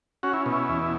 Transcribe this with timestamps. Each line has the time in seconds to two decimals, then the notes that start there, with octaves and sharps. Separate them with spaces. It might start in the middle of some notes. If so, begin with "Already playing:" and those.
0.23 C#4 F#4
0.33 E4
0.46 B2
0.52 E4
0.69 E2